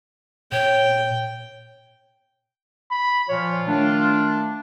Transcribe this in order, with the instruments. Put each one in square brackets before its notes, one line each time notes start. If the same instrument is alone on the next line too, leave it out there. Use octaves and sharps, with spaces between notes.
[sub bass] A#2 [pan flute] C#5 [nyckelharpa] G5
[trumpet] B5
[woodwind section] A#2 F3 C#5 [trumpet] F4
[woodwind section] D#3 A3 D4